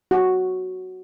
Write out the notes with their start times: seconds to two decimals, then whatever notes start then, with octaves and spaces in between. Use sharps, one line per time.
0.11 F#4